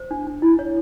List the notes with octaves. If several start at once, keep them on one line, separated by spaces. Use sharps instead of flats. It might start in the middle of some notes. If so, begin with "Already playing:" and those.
Already playing: C5
D4
D4
E4
C#5